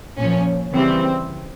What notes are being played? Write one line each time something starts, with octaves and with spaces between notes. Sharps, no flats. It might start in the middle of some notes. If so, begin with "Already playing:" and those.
A#2 F3 C#4
C#3 E3 G3 C4